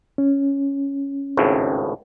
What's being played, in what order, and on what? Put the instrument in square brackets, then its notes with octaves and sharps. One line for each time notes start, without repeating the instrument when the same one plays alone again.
[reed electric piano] C#4
[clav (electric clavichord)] G#1 C#2 A2